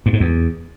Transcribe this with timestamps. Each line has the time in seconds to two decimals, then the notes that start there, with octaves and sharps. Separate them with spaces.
0.06 G2
0.13 G#2
0.20 E2